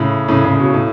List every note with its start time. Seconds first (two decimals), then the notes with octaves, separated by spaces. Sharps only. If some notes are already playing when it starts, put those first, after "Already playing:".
Already playing: A2 C#3
0.29 A2 C#3
0.44 A2 C#3
0.55 C#3
0.60 B2
0.74 A2